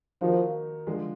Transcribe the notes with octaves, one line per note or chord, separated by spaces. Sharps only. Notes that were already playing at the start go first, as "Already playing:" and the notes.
D#3 F3 A#3 D#4 F#4
D3 F3 G#3 D4